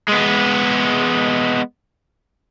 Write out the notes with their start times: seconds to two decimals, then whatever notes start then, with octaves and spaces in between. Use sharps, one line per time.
0.08 G#3 B3